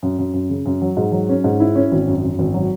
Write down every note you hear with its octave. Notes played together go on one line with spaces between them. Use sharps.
F#2
F#2
F#2
C#3
F#2
F#3
G#2
F#3
C#4
G#2
E4
C#4
G#1
F#2
F#2
G#1
F#3